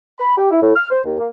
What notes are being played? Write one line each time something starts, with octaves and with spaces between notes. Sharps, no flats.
B5
G4
E4
A2
F6
C5
D#2
A#3